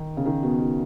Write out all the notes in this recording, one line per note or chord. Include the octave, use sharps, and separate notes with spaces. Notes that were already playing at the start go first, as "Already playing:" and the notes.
Already playing: D#3
C#3
D#3
B2
B2